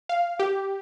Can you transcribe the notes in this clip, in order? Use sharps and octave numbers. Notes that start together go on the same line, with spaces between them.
F5
G4